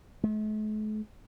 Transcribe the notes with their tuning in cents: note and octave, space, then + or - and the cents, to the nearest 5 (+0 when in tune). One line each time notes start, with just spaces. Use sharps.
A3 -45